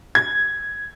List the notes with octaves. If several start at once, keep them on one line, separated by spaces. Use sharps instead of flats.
G#6